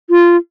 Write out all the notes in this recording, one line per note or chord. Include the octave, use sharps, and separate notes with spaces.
F4